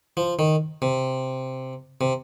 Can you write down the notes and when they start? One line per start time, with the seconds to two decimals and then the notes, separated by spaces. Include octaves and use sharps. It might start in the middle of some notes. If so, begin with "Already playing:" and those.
0.17 F3
0.39 D#3
0.82 C3
2.01 C3